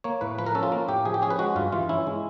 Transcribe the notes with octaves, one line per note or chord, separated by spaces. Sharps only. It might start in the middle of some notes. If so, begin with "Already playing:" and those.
A#3 C#5
A2 B4
F3 B4
A#4
C#4 A4
F4
A#3
A2 G4
F3 G#4
G4
C#4 G#4
B4
G#3 F#4
G2 F4
E3 F4
C#4 E4
G#3